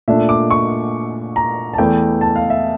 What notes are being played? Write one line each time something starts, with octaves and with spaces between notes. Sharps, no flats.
A#2 A3 D4 E5
D6
C#6
A#5
A5
E2 E3 A3 G5
A5
F5
E5